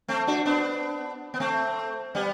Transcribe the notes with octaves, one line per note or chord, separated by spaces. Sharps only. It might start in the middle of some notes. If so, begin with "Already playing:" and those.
A3 C4
D4 F#4
B3 D4
B3
A3 C4
G3 B3